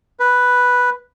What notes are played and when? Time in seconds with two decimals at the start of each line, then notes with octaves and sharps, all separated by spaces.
0.20 B4